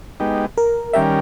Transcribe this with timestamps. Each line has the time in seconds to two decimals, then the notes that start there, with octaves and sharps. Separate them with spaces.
0.20 G#3 B3 D#4 G4
0.57 A#4
0.93 D#3 G3 C#4 G4 A#4 E5